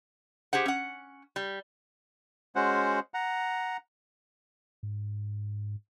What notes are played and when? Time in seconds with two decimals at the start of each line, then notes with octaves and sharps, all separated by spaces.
0.53 G4 G#4 C5 F#5
0.66 C#4 F#5
1.36 G3
2.56 G#3 C#4 F#4 C5 F#5
3.14 F#5 A#5
4.83 G#2